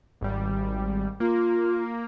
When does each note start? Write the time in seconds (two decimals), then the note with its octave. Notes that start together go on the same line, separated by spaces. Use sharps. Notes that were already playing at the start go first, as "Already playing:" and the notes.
0.21 G#1 G3
1.20 A#3 F4